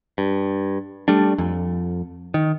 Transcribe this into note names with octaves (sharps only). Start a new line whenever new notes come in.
G2
G3 A3 D4
F2
D#3